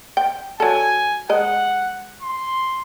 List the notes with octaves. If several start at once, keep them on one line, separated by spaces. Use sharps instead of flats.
G5
F#3 A4 G#5
G#3 D#5 F#5
C6